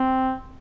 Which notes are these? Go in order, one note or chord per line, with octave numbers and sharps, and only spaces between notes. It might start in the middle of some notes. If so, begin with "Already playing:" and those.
Already playing: C4